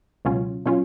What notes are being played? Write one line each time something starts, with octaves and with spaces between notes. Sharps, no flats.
C#2 B2 F#3 C#4 F4
B2 F#3 C#4 F4